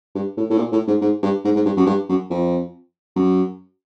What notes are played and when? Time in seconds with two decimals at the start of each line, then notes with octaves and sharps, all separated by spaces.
0.15 G2
0.37 A2
0.50 A2
0.58 A#2
0.72 A2
0.87 G#2
1.01 G#2
1.23 G2
1.45 G#2
1.56 G#2
1.65 G2
1.77 F#2
1.87 G2
2.09 F#2
2.30 F2
3.16 F#2